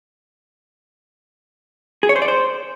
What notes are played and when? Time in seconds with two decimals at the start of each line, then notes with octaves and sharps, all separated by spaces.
2.03 G#4
2.09 C#5
2.16 C5
2.22 D5
2.28 C5